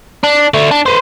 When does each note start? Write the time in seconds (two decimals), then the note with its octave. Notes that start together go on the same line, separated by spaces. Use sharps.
0.24 D4
0.54 D3 A3
0.71 D4
0.86 B4 C5